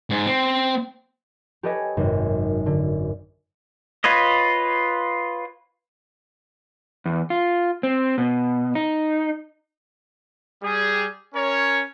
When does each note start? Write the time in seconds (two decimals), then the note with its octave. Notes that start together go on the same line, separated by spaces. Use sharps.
0.10 G#2
0.27 C4
1.63 G4 A4 B4 C#5 D#5 G#5
1.97 G#1 F#2 C3
2.66 D3
4.04 F4 B4 C#5 D#5
7.06 E2
7.30 F4
7.83 C4
8.18 B2
8.75 D#4
10.63 G3 G#4
11.35 C#4 A#4 C#5